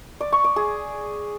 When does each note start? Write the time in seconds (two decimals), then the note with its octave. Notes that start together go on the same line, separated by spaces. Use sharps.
0.21 D5
0.32 C#6
0.44 D5
0.56 G#4